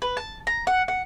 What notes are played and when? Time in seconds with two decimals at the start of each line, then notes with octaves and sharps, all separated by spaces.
0.02 B4
0.17 A5
0.47 A#5
0.67 F#5
0.88 F#5